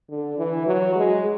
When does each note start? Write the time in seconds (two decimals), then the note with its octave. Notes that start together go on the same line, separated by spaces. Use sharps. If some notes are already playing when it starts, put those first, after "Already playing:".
0.10 D3
0.38 E3
0.66 F#3
0.96 G#3